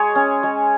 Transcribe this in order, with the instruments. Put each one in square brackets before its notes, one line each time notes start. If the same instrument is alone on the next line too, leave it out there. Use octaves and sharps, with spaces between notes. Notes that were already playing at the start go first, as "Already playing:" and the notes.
Already playing: [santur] G#3 G#4 C#5
C#4
G#3